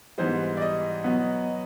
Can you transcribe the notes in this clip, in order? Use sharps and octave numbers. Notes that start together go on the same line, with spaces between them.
G#2 E3 G3 B3 C5
D5
D#5
B2 F#3 B3